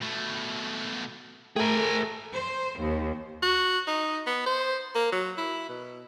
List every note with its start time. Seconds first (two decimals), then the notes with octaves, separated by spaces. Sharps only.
0.02 B2 A3
1.56 A3 G#4 A#4 G5 G#5
2.34 C5
2.79 D#2
3.43 F#4
3.88 D#4
4.27 B3
4.46 C5
4.95 A#3
5.12 F#3
5.38 E4
5.69 B2